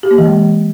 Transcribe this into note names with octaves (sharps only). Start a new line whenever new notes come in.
G4
A#3
E3
G#3